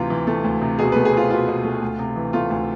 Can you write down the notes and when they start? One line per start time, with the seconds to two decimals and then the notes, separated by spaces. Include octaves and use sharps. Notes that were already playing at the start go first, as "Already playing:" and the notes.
Already playing: D2 C3 E3 F4
0.10 E3
0.27 A3
0.44 D2
0.61 C3
0.79 B2 G#4
0.92 A3 B4
1.05 G#4
1.13 C4 F4
1.30 B2 F4
1.48 B2
1.65 A3
1.82 D2
1.99 C3
2.16 E3
2.33 A3 F4
2.50 D2